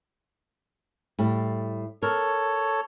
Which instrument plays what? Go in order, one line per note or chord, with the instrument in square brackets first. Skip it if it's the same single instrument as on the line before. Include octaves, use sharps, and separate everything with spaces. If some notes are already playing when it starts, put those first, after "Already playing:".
[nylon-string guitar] A2 G3
[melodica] A4 C#5 [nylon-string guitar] A#4